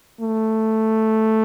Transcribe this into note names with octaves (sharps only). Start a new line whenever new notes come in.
A3